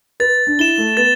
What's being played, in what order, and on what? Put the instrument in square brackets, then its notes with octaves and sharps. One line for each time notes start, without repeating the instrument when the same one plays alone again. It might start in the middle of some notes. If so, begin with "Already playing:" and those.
[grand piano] B4 [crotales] A6
[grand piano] D4
[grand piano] E4 [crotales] E7 G7
[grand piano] A3
[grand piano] B3 [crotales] A6